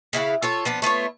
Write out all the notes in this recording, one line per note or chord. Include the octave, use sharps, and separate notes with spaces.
C#3 E4 F5 F#5
F4 A4 C#5
F3 B3 D4
A3 B3 F4 C#5